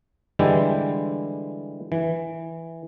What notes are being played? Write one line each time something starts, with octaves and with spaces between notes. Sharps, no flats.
D3 E3 G3 G#3 E4 G4
E3